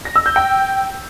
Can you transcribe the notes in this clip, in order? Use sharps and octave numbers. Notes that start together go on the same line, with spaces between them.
A#6
E6
G6
G5